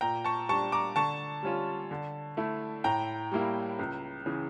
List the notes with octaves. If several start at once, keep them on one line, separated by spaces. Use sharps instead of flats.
A#2 G5 A#5
A5 C#6
G3 D4 A5 C#6
A#5 D6
D3 A5 C#6
G3 C#4 F4
D3
A3 E4
A2 G5 A#5
G3 A#3 E4
C#2
C#3 E3